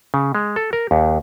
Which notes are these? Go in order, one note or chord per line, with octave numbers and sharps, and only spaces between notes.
C#3
G#3
A4
A#4
D#2